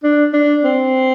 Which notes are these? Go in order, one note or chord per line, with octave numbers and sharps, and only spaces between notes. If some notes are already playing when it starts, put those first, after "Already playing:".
D4
D4
C4